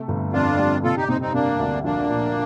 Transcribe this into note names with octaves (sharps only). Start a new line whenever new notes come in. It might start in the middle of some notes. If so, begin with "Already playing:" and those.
Already playing: C3 A3
G1
F2 D4 F4
G3
C3 F4 A4
D#4 G4
C3 C4 D#4
C4 D#4
C3 A#3 D4
D2
A#1 A#3 D4
A#2